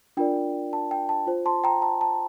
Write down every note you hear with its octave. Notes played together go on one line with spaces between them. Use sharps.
D4 F4 A#4 D5 G5
A5
G5
A5
F4 C5
A5 C6
G5 A#5
A5
A5